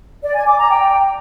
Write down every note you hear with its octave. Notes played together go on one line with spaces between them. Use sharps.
D5
G#5
D6
A#5
G5